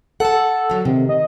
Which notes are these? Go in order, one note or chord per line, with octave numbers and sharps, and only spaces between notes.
A4 F#5 A5
D3 F#3
C3 D#3
D#5